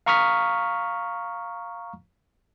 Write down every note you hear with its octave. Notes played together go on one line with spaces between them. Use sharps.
F5 A#5 C#6 D#6 F6 B6